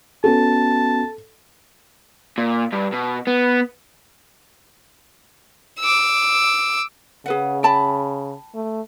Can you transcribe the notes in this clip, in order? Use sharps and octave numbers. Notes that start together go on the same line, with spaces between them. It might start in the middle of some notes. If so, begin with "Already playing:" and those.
B3 C#4 F#4 A4 A5
A#2
G2
B2
B3
D6 E6
C#3 G#4 B4 F#5
G5 A5 B5
A3